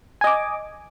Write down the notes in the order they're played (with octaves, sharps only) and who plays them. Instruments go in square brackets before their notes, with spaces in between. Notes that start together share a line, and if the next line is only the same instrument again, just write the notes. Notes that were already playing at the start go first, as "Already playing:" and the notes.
[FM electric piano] G#5
D#5
D6